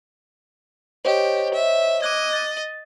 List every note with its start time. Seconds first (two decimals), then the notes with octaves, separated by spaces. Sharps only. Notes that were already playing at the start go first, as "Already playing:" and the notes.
1.05 G4 C5 C#5 D#5
1.54 E5
2.02 D#5 D6 F#6 G#6
2.33 A6